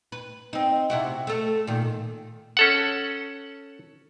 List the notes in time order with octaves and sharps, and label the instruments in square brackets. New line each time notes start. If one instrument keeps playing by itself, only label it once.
[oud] B4
C4 D#4
C3 E4 F#4
A3 A4
A#2 D#3
[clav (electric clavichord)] C#4 A4 F#5